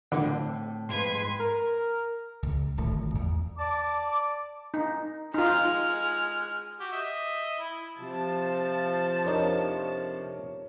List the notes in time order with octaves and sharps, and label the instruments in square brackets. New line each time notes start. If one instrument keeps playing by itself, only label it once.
[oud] A2 C4 [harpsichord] D3
[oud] F2 [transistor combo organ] G#2 C6 [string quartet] B4 G#6
[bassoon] A#4
[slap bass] C#2
D1 G#1 A#2 A3
E2
[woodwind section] D5 A5 D6
[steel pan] D#4
[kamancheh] G#3 F6 [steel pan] D#4 F4
[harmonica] F#4 G4
D#5 E5
E4
[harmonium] C3 [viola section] F3 A5
[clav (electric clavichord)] F2 D4 D#4 [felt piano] A#4 C#5